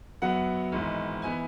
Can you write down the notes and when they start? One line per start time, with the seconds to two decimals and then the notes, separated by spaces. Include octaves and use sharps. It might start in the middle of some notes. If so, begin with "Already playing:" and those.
0.22 F#2 F#3 B3 F#5
0.72 G#1 G#2 E3
1.22 E3 B3 E4 G#5